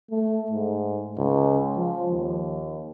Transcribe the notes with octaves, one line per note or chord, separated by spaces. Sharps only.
A3
G#2
C#2
F3
D#2